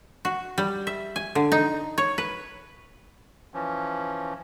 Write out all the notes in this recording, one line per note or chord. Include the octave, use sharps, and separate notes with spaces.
F#4
G3
E5
G#5
D3
D#4
C#5
B4
E3 F3 C#4